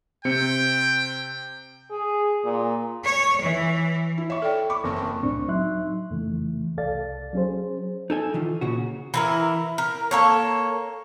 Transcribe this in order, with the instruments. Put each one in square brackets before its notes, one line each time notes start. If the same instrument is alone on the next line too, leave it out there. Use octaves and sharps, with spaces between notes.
[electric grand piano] C3 C4 C#7 [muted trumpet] G5
[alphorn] G#4
A#2
[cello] C#5
E3
[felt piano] E4
[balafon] C#5 [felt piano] E5 C#6
[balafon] A4 D5 G5
[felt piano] B5 C#6 D6
[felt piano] F#1 [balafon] C4 C#6
[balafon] C#6
[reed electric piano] C#2 A2 C4 D4 C#6
F#3 D#4 E5 C6 F#6
F2 C#3 E3 A3
C2 A4 D5 F5 A6
F#3 C#4 G#4 C5
[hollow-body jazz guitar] D#4 A4 G#5
D#3 E3 F4
A#2 C#3 F#4
[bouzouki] E3 E4 A#4
A#4
A#3 A4 C#5